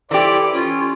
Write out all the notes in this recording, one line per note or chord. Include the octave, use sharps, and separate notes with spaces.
E3 E4 G4 A4 C5 D5
C#4 F4